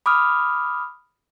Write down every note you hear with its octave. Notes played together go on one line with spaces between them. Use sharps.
B5 D6 D#6 F6